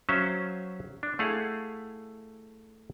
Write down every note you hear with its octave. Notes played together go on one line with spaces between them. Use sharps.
F#3 C#4 C5 E5 F5
D4
A3 E4 G#4 F5 F#5